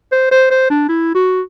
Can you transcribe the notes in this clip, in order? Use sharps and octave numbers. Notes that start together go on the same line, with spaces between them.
C5
C5
C5
D4
E4
F#4